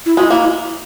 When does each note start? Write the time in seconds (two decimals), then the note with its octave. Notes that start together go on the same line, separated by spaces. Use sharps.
0.06 E4
0.17 G#3 F#4
0.30 A#3 E4